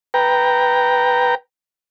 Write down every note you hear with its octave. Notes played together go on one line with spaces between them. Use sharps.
B4 G5 A#5